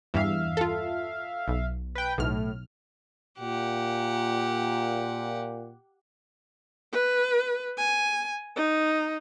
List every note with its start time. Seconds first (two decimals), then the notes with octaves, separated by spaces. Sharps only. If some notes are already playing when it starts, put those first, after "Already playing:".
0.14 E2 G2 E3 E5 F5
0.57 F4 A4
1.48 B1
1.95 B4 G5
2.18 B1 A2 F6
3.39 A#2 G4 F#5
6.92 B4
7.77 G#5
8.56 D#4